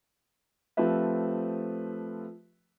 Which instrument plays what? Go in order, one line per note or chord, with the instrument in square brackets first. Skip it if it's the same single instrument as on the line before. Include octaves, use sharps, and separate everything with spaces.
[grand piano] F3 A3 C4 G4 B4 E5